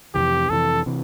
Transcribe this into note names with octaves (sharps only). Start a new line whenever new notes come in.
F2 C3 E3 G4
F2 C3 E3 A4
C3 E3